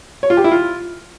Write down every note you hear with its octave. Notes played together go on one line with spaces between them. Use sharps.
C#5
F4
G4
E4
F4